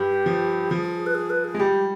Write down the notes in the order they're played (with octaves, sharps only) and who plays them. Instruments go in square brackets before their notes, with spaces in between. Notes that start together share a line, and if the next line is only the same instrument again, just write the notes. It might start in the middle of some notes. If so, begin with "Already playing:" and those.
Already playing: [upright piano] G2 [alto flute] G4
[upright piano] F3
[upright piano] F3 [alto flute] G#4
[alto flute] B4
G#4
B4
G#4
[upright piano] G#3
[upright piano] G3 [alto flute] G4